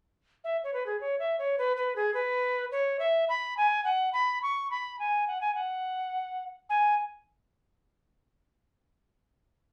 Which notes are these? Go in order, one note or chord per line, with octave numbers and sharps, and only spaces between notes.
E5
C#5
B4
G#4
C#5
E5
C#5
B4
B4
G#4
B4
C#5
E5
B5
G#5
F#5
B5
C#6
B5
G#5
F#5
G#5
F#5
G#5